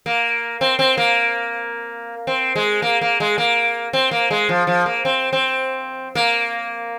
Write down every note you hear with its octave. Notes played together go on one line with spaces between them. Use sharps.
A#3
C4
C4
A#3
C4
G#3
A#3
A#3
G#3
A#3
C4
A#3
G#3
F3
F3
A#3
C4
C4
A#3